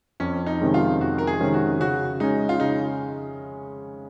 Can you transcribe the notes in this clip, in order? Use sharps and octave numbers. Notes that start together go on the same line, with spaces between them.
F2 C#4
D#4
C3 D#3 G#3 C#4
F4
F2 F#4
A#4
G#4
C3 D#3 G#3 C#4
F#4
C#3 F#4
G#3 C#4 D#4
F4
C#3 D#4